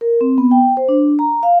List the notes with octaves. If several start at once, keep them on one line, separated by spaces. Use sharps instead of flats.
A#4
C4
B3
G5
C5
D4
A#5
F5